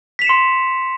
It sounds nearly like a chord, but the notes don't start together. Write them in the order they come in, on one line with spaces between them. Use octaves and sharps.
B6 F7 E7 C#7 C6